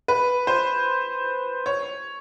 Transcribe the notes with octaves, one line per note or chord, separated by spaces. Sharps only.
B4
C5
C#5